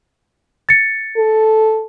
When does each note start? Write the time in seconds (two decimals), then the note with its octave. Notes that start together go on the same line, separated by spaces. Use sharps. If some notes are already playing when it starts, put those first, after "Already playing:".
0.69 A6 C#7
1.17 A4